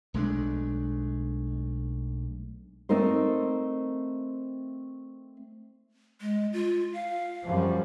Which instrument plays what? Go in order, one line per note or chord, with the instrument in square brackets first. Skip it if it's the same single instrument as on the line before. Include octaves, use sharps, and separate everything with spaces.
[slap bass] B1 G#3 A3 D4
[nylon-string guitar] A3 C4 D#4 A#4 C5
[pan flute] G#3
F4
F5
[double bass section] F#2 F3 G3